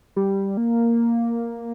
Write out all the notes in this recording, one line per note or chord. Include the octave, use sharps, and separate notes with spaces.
G3
A#3